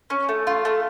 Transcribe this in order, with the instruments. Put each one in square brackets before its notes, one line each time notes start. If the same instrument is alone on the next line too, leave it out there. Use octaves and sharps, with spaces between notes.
[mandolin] C#4
A3
F4
A3